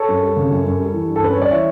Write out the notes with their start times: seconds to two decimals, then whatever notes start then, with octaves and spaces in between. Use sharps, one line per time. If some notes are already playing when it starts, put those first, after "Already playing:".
Already playing: A4 C#5
0.09 F#2
0.23 G3
0.37 C#3
0.51 F#2
0.66 F#2
0.80 G3
0.93 E3
1.07 G2
1.16 A4
1.22 C#4 B4
1.34 G3 C#5
1.41 D5
1.51 E3 C#5 E5